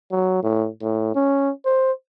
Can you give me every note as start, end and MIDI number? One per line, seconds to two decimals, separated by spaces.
0.11 0.39 54
0.43 0.68 45
0.82 1.14 45
1.15 1.51 61
1.65 1.92 72